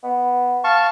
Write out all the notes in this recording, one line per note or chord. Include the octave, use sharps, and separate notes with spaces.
B3
F5 A5 C#6